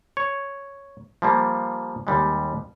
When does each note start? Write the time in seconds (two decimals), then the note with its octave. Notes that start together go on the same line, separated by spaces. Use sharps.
0.17 C#5
1.22 F3 G3 A#3
2.07 D#2 G3 G#3